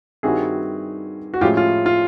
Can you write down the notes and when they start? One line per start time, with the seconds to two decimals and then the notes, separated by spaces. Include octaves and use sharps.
0.23 G2 D#3 G3 C4 E4 F#4 G#4
1.34 F#4
1.41 A2 F3 G#3 C#4 E4 F4 G4
1.57 F4
1.86 F4